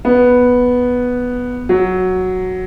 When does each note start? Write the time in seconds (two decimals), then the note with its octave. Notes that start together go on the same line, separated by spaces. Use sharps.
0.05 B3
1.69 F#3